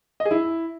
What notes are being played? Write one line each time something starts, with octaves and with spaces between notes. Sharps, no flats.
D#5
G#4
E4